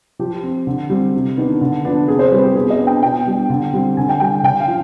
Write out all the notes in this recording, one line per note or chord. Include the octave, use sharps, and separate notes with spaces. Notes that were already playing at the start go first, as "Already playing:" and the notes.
F3 G4
C4
D3
G3 C4
C3
D#3 B3 D4
D3
F3 B3 D4
C3 G#4
C5
G3 C4 B4
G4
B2 G#4
D#5
B3 D4
G5
B2 G5
G3 D4
D3
G3 C4
D3 G#5
G5
G3 D4 G5
D3 G5
F5
F3